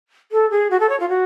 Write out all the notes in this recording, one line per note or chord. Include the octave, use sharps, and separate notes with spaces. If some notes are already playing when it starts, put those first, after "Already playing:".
A4
G#4
F#4
A4
C#5
F4
F#4